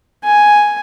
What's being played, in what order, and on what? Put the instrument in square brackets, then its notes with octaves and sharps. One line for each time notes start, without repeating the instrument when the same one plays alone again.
[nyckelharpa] G#5